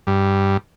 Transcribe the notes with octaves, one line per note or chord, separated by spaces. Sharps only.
G2